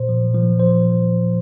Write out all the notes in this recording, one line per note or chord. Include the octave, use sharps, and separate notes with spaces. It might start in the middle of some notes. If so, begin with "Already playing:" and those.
Already playing: A#2 C5
F3
F3
C5